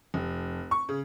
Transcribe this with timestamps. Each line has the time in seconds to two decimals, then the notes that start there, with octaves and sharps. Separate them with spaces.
0.14 F1
0.71 C#6
0.89 C#3